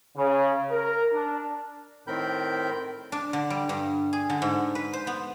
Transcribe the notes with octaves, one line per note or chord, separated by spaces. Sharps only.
C#3
A#4
D4
A2 D#3 C4 A#4 B5 G6
D4
D3
G3
G2
G#4
D3
G#2
B4
C5
B3